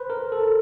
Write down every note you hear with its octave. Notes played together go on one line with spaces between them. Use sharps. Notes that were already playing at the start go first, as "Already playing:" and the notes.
Already playing: B4 C5
A#4
A4